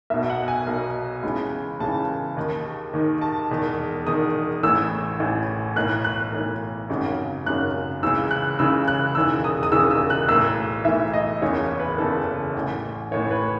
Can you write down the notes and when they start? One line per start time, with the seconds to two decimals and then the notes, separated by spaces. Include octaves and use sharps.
0.10 B1 B2 E5
0.30 F#5
0.48 G#5
0.67 B1 B2
1.23 C#2 C#3 E3
1.80 C#2 C#3 E3 A5
2.37 D#2 D#3
2.93 D#2 D#3
3.21 A5
3.50 E1 E2 D#3
4.06 E1 E2 D#3 D#6
4.63 A1 A2 E3 E6
5.20 A1 A2 E3
5.76 B1 A2 E3 F#6
6.04 F#6
6.33 B1 A2 E3
6.90 G#1 F#2 C#3
7.46 G#1 F#2 C#3 F#6
8.03 C#2 C#3 E3 E6
8.31 F#6
8.59 C#2 C#3 E3 E6
8.88 F#6
9.15 E1 D#2 C#3 E3 E6
9.44 D#6
9.63 D#6
9.72 E1 D#2 C#3 E3 E6
9.91 E6
10.10 F#6
10.28 B1 A2 E3 E6
10.85 B1 A2 E3 E5
11.13 D#5
11.42 F#1 E2 C#3 E3 C#5
11.80 B4
11.98 F#1 E2 C#3 E3 A4
12.55 A1 A2 E3
13.11 A1 A2 E3 C#5
13.31 B4